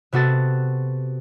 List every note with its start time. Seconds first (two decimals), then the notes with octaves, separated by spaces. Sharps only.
0.12 C3 B3 F#4 A4 A6